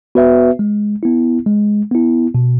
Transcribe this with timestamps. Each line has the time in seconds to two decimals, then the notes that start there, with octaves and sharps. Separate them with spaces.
0.15 B3 F#4 B4 E5
0.59 G#3
1.03 B3 E4
1.46 G#3
1.91 B3 E4
2.35 B2